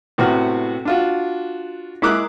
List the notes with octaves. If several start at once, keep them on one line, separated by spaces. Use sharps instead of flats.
A2 C3 B3 F#4 F6
D4 F4 F#4
G#3 E4 A#4 D6 D#6 F#6